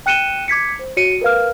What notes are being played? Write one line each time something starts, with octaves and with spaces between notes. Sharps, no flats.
G5 F#6 C#7 D#7 E7 G7
D6 G#6 B6 C#7
C5
F#4 C#5 C#7 D#7
A#4 B4 F5 F6